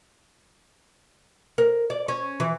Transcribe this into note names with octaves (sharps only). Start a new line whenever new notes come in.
A#4
D5
C#4
E3